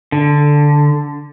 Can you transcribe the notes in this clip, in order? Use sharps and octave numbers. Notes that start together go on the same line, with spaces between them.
D3